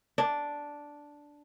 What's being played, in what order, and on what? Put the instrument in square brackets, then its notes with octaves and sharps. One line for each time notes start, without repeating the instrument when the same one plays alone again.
[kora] D4